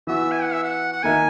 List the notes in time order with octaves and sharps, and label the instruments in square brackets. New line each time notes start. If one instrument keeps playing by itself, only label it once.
[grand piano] E3 B3 F#4 [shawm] E5
[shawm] G#5
F#5
E5
F#5
F#5
[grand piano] D#3 A#3 D#4 A#4 E5 [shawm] G#5